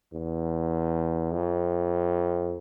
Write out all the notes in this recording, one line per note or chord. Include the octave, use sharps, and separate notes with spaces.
E2
F2